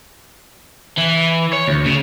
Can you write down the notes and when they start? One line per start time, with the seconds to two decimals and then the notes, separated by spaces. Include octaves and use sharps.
0.98 E3
1.53 C#5
1.68 D2
1.85 C#3